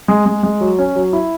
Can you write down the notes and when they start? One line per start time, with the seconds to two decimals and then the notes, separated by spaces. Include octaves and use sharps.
0.08 G#3
0.26 G#3
0.43 G#3
0.61 F#3
0.79 C#4
0.96 F#3
1.13 E4